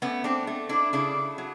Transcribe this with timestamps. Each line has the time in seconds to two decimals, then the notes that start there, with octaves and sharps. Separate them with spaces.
0.02 A3 B3 C#4
0.24 C4 D4
0.47 A3
0.69 D4 E4
0.93 C#3 D4 E4
1.38 F#3